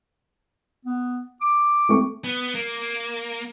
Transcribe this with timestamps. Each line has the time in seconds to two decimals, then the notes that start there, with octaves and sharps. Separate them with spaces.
0.85 B3
1.41 D6
1.89 A3 C4 C#6
2.24 B3
2.55 A#3